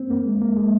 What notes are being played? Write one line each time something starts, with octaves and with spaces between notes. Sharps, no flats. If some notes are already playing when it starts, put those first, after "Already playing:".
Already playing: A#3 C4
A#3
G#3
A#3
G#3